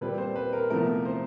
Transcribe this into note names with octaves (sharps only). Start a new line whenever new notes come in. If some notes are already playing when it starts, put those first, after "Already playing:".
A#2 G3 C4 B4
C5
B4
A#4
E2 C3 F3 A3 A#4
C5